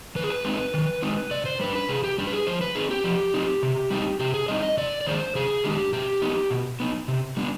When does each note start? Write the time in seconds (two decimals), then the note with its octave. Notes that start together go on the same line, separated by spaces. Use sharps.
0.15 D#3 B4
0.23 G#4
0.30 B4
0.45 G#3 C4 D#4
0.74 D#3
1.02 G#3 C4 D#4
1.31 C3 D5
1.46 C5
1.60 G3 D4 B4
1.75 B4
1.89 C3 G#4
2.04 G4
2.18 G3 D4 G4
2.27 B4
2.32 G#4
2.47 F3 C5
2.61 B4
2.75 C4 D#4 G#4
2.90 G4
3.04 F3
3.34 C4 D#4
3.63 C3
3.90 G3 C4 D#4
4.20 C3 G4
4.34 G#4
4.48 G3 C4 D#4 D#5
4.63 D#5
4.77 C3 D5
5.01 D5
5.06 D#3 G#3 D4 C5
5.35 C3 G#4
5.64 D#3 G#3 D4 G4
5.93 B2 G4
6.22 B3 D#4
6.51 B2
6.80 B3 D#4
7.08 C3
7.37 G3 B3 D4